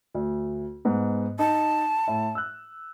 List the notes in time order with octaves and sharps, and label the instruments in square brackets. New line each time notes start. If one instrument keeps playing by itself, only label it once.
[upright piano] D2
G#2 B3
[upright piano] D#4 [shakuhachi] A5
[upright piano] A2
E6 F#6